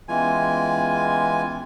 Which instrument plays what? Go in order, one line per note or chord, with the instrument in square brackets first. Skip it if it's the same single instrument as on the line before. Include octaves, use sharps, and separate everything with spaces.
[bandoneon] E3 G#5 [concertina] G#3 F4 [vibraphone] B3 C#4 G5